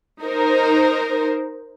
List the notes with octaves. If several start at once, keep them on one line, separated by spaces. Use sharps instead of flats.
D#4 A#4 C5